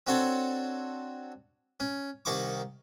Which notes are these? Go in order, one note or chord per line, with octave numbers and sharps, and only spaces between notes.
C4 D4 F#4 A4 C#5
C#4
C2 D#3 D#4 C#6 D6